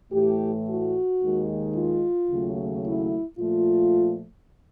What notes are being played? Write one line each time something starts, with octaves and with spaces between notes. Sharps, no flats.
A2 E3 A3 G4
F#4
D#2 D#3 G#3
F4
D#2 C#3 F#3 A3
E4
A#2 F3 A3 F4